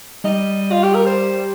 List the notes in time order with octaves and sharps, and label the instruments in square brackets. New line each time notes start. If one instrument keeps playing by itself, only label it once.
[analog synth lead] G3 [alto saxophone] D#5
[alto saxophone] F4
G4
A#4
C5